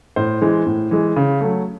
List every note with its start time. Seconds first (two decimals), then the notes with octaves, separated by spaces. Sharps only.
0.16 A2 C5
0.42 E3 G#3
0.66 A2
0.91 E3 G#3
1.16 C#3
1.41 F#3 A3